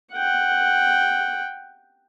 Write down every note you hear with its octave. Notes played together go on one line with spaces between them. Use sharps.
F#5 G5